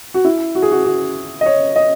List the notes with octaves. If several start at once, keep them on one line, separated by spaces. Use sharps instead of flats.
F#4
E4
F#4
G#4
F#4
F#4
D#5
C#5
D#5